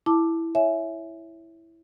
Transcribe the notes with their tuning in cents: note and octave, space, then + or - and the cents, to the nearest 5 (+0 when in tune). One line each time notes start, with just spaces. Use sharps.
E4 +0 A5 +0 D6 +5
C#5 +0 E5 +0 G#5 +10